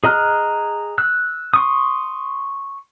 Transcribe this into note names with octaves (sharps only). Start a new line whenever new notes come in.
G#4 D#5 A#5 F6 F#6
E6 F#6
C6 C#6 D#6